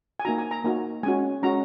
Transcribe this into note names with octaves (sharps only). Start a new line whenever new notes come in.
G#5
A#3 D#4 F#4 A#5
G#5
A#5
A#3 D#4 F#4
G#3 C#4 F#4 G#5
G#3 C#4 F#4 A#5